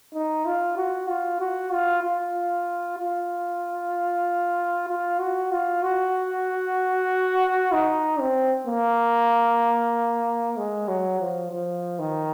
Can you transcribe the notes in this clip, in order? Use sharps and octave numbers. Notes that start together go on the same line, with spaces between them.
D#4
F4
F#4
F4
F#4
F4
F4
F4
F4
F#4
F4
F#4
D#4
C4
A#3
G#3
F#3
F3
F3
D#3